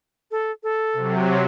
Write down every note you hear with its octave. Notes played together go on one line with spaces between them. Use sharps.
A4
A4
C3 F#3